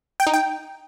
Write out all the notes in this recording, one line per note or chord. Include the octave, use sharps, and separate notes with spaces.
G5
D#4
G5